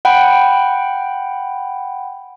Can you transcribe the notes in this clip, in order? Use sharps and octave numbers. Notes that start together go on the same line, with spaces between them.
F#5 G5 B5